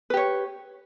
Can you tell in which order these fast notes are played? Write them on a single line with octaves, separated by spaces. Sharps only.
B4 G4 C#5